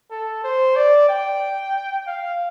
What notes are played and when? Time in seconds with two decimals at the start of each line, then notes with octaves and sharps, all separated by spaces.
0.11 A4
0.44 C5
0.76 D5
1.09 G5
2.07 F5